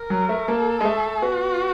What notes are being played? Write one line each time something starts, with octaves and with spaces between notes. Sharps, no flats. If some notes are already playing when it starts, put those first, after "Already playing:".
Already playing: A#4
F#3
A3
A#3 A4
G#3
A3
B3 F#4